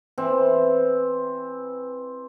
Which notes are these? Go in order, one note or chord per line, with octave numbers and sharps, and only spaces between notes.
E3 C4